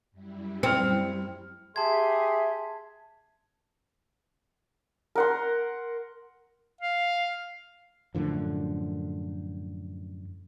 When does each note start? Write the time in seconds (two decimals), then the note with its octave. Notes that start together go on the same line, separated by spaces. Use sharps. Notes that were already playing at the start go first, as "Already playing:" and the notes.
0.11 F#2 G3 E4
0.63 C4 F6 C#7
1.76 G4 G#4 E5 A5 C6 G#6
5.15 A#4 F#5 C6
6.81 F5
8.15 F#2 A2 D3 F3